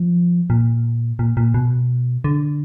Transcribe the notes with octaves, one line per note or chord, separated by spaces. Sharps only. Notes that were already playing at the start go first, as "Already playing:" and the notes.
Already playing: F3
A#2
A#2
A#2
B2
D3